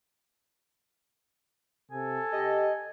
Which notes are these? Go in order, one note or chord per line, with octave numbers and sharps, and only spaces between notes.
C3 A4 G#5
G4 D#5